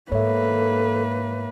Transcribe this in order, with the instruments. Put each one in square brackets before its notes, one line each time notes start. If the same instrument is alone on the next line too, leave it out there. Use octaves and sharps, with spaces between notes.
[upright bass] G#2 [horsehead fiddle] A#3 B4 [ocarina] A4 [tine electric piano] C#5 E5